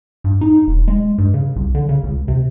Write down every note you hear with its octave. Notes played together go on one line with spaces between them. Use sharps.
G2
D#4
E1
G#3
G2
C#3
C2
D3
C#3
C#2
C3